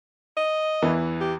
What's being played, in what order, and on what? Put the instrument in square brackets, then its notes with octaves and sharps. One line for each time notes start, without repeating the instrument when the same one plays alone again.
[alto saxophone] D#5
[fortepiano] E2 E3
[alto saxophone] G4